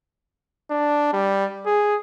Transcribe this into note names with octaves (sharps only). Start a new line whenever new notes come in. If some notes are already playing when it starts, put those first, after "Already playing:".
D4
G3
G#4